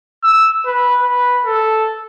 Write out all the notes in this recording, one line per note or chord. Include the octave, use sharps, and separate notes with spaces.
E6
B4
B4
A4